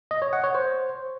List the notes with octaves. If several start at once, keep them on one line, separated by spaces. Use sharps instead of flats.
D#5
C#5
F#5
C#5
C5